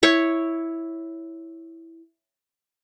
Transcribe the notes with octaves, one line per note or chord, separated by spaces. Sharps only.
E4 C#5 C#6